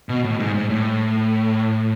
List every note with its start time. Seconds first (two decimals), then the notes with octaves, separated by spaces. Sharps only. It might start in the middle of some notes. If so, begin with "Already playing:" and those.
0.09 B2
0.24 A2
0.40 G#2
0.54 G#2
0.70 A2